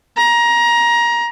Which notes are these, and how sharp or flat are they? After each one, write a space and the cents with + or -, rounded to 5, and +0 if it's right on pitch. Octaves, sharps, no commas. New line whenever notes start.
A#5 +20